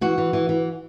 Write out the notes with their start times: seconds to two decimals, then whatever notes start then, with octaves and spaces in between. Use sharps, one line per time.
0.01 E3 F#4
0.18 E3
0.33 E3
0.49 E3